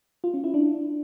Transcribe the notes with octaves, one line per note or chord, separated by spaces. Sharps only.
F4
C#4
E4
D4